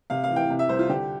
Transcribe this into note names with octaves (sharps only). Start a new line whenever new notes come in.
C3 F5
F5
E3
G5
C3
E5
C2 C5
F4
D3 G4